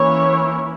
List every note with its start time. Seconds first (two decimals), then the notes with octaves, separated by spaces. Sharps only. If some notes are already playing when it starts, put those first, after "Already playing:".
Already playing: E3 A#3 C#4 E4 C#5